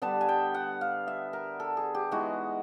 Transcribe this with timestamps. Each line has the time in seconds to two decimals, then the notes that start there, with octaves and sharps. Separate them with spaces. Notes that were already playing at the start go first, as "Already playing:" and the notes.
0.02 D3 G3 B3 D4 A5
0.21 G#5
0.29 G5
0.54 F#5
0.81 F5
1.08 E5
1.33 A#4
1.60 A4
1.77 G#4
1.95 G4
2.11 E3 G#3 B3 D#4 F#4